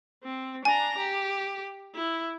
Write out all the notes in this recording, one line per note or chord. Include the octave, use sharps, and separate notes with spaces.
C4
D4 G#5 A#5
G4
E4